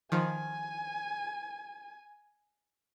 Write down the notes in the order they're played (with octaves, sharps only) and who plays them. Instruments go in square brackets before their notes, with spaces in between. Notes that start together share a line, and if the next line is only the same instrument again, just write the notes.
[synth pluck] D#3 F3 [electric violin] G#5